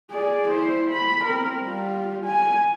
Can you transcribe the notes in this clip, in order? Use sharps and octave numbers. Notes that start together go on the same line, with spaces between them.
G#4 D5
E4 C5
B5
C4 A#4
G3 F4
G#5